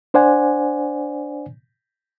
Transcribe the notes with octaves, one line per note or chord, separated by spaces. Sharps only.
D4 C5 D5 F#5 G#5